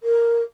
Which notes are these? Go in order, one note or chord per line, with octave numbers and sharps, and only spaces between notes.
A#4